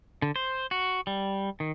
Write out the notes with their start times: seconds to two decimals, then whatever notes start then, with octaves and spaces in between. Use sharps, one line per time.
0.22 D3
0.36 C5
0.71 F#4
1.07 G3
1.60 D#3